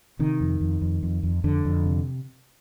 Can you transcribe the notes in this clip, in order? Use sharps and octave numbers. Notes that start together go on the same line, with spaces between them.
C3 D#3
F2
F2
F2
F2
F2
F2 D3
F2
C3